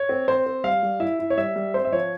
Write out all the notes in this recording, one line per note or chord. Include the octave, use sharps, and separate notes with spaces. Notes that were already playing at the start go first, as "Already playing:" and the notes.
Already playing: C#5
C4
C4 C5
C4
G3 F5
G3
E4 E5
E4
C#5
G3 E5
G3
C4 C5
E5
F3 C#5